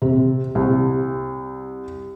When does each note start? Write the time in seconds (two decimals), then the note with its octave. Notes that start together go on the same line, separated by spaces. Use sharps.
0.02 C3
0.55 C2